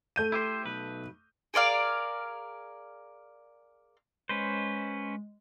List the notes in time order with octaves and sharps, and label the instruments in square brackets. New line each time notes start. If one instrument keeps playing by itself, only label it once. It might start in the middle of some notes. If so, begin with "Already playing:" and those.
[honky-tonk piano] A3 G6 D#7
[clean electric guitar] E4 G4 C5
B1 B4
[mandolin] G#4 A#4 D5 F5
[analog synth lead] G#3 [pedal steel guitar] C#4 B4 C5